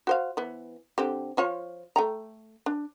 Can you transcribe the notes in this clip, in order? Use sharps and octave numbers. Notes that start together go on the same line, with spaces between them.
F#4 C5 F5
E3 B3
D3 C4 G4
F3 F4 C#5
A3 G5 A#5
D4